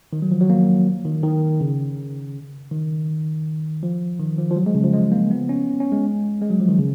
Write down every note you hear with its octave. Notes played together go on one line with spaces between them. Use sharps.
D#3
F#3
F3
F#3
A#3
D#3
D#3
C#3
D#3
F3
D#3
F3
F3
F#3
G#3
C#3
F3
G#3
A#3
B3
C#4
C#4
G#3
G#3
F#3
F3
D#3
C#3